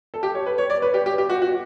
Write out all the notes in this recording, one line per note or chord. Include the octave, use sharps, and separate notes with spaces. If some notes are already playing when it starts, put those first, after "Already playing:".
A4
G4
C#5
B4
C#5
D5
B4
G4
G4
G4
F#4
F#4